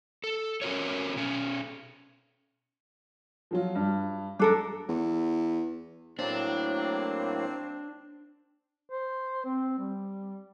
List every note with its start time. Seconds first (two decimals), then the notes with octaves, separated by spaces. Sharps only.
0.24 A4
0.61 C#4 F4 F#4 A#4 C#5
1.16 B2 C#4
3.51 F3 F#3 F4
3.75 G2
4.39 F#2 D4 A4 A#4
4.89 E2
6.19 A2 F#3 A#3 C4 D4
8.90 C5
9.45 C4
9.79 G3